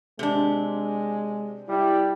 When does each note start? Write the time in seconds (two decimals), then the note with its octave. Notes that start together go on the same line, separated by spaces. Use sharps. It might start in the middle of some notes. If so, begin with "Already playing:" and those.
0.19 C3 G#3 D4
1.68 G3 E4